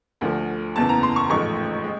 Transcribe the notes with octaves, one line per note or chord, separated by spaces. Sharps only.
D2 D3 F3 A3
F#1 E2 C#3 E3 A5
A#5
C6
C#6
A1 G#2 F3 A3 C#6
G#3